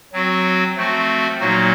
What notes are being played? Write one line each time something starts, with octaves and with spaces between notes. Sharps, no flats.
F#3 C4 F#4
F3 A3 C4 F#4
A#2 F#3 A#3 D#4 F#4